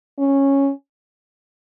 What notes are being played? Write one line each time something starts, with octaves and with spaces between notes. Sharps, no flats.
C#4